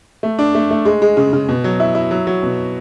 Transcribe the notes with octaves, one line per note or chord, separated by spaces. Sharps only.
A3
D4
A3
A3
G#3
G#3
C#3
C#3
B2
F#3
E4
E4
F#3
F#3
B2